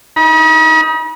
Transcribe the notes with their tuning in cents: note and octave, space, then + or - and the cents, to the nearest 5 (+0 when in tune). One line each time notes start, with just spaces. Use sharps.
D#4 +20 B5 -45